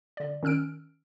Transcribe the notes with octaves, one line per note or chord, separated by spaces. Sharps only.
D3 D5
D#3 C#4 E6 F6 D7